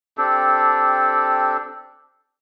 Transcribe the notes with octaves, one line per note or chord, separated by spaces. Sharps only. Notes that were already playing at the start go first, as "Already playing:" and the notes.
C4 D4 G4 A4